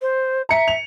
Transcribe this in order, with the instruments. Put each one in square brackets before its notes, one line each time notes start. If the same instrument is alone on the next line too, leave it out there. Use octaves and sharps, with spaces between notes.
[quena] C5
[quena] E5 [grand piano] A#5 C#7
[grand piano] F7